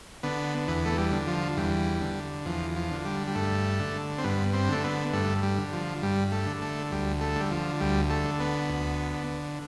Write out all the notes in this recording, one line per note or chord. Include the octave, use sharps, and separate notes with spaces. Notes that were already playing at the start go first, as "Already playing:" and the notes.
D3 B3
E2 B3
A3
G3
D3
F3
E2 G3
D3
E2 F3
F3
D3
G3
G3
G2 A3
D3
C4
G2 B3
C4
D3 A3
B3
G2 A3
G3
D3
F3
G2 G3
A3
D3
A3
D2 G3
A3
D3 G3
F3
D2 G3
A3
D3
B3
D2
D3